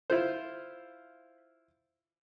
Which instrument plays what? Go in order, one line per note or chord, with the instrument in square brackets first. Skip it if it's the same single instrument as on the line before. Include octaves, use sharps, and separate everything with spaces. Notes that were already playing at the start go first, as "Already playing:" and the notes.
[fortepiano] E4 F4 C5